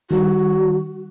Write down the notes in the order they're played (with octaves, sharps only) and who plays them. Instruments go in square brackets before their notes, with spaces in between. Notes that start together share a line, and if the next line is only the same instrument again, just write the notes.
[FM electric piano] D#3 G3 [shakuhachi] F#4